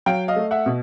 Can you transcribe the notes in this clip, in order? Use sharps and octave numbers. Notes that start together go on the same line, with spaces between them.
F#3 F5 G5
D#5 F5
A3
E5 F#5
B2